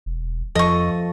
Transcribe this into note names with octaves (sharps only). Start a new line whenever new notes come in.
E1
F2 F3 A4 D#5 C#6